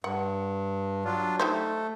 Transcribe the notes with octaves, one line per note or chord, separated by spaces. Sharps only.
G2 F#5
F#3 D4 F4
A3 D#4 G4 C5